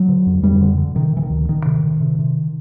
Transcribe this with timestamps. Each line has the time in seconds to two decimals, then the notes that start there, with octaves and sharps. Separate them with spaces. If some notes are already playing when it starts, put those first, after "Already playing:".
Already playing: F#3
0.09 D3
0.26 F2
0.43 F2 G3
0.61 D3
0.78 D3
0.95 C3 D#3
1.13 C3 E3
1.22 D#3
1.30 D2
1.48 D2 D#3
1.66 C3
1.84 C3
2.00 C3
2.19 C3